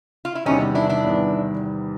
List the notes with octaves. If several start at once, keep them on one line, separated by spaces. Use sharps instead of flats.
F4
E4
E2 C3 D#3 G3 B3 C#4 D#4
D4 E4
D4 E4
E2 C3 D#3 G3 B3